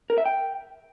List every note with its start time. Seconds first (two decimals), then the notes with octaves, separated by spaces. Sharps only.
0.10 A#4
0.18 E5
0.26 G5